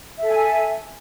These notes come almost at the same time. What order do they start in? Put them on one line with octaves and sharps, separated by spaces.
E5 A4 G#5